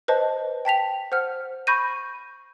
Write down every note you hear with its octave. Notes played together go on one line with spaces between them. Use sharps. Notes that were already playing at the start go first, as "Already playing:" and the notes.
B4 C5 D#5 A5
G5 A5 B6 F7
C5 F#5 F6
B5 C#6 G6 A#6 D#7